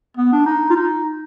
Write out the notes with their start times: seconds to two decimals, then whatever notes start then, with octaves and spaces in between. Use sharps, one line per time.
0.17 B3
0.32 D4
0.46 D#4
0.70 F4
0.76 D#4